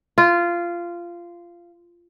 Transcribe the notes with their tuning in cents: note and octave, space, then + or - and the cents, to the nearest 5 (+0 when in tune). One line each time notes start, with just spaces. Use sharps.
F4 -15